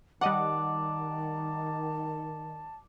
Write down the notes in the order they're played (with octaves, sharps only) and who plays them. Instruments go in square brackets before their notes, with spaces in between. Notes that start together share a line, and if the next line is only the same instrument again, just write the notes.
[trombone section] D#3 [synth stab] G3 D#5 F#5 [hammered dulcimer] D5 [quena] A5